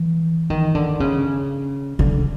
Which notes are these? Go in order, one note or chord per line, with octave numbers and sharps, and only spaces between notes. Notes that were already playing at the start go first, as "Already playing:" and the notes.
Already playing: E3
D#3
D3
C#3
D3